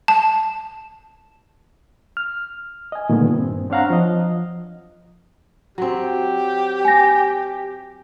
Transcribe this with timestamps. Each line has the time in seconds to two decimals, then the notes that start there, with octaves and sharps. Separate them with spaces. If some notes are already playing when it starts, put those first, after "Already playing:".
0.08 A5
2.17 F6
2.92 D#5 G#5
3.10 A#2 D3 D#3 G3 A3 B3
3.34 G2 C4
3.70 C4 D4 C#5 F5 F#5 A#5
3.90 F3 D#5
5.78 F#3 C4 G4
6.85 G#5 A#6